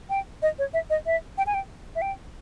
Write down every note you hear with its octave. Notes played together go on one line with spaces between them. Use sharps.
G5
D#5
C#5
E5
D#5
E5
G5
G#5
G5
E5
G5